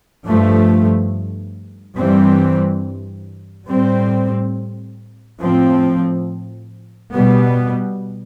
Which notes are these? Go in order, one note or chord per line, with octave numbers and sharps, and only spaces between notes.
G2 F3 A3
G2 E3 G3 C4
A2 G3 C4
A2 F3 C4
B2 G3 B3